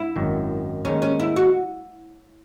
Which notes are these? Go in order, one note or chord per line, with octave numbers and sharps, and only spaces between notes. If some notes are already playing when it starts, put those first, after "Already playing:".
Already playing: E4
G#1 F#2 D#3
D#2 D#3 G#3 C#4 D#4
C#4
E4
F#4